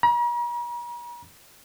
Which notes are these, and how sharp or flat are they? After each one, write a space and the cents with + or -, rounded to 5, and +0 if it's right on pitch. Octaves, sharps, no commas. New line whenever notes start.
A#5 +45